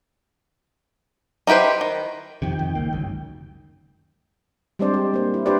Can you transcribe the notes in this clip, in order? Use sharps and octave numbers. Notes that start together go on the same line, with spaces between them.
D#4 E4 G4 B4 C5
D#3
F2 C3 D#3 G5
F2
C#2 A#3
G1 C#2 F#2
G3 G#3 C4 D4 C5 D5
G4
A#3 C5
E4
D4 E4 G4 B4 C5 D5